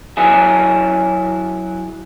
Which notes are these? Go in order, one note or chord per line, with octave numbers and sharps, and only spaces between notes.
F#3 E4 G#4